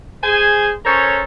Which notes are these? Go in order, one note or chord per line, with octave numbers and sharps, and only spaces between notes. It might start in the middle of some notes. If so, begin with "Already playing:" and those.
G#4 C5 G#5
C#4 A4 A#4 C5 C#5